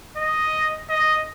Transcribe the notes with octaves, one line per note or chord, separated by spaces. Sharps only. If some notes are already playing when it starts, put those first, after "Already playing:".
D#5
D#5